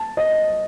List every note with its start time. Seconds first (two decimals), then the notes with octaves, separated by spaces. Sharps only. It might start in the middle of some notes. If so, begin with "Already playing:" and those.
Already playing: A5
0.17 D#5